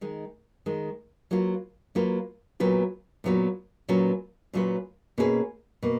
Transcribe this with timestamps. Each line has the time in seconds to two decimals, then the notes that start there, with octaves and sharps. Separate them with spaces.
0.01 D#3 G#3 D#4
0.66 D#3 G#3 D#4
1.31 F#3 A#3 F4 B4
1.95 F#3 A#3 F4 B4
2.60 A#2 F#3 B3 F4 B4
3.24 A#2 F#3 B3 F4 B4
3.88 A#2 F#3 C#4 F4 B4
4.53 A#2 F#3 C#4 F4 B4
5.18 B2 A#3 C#4 G#4 B4
5.83 B2 A#3